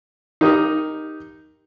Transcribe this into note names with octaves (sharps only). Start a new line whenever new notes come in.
D#4 G4 A#4 D#6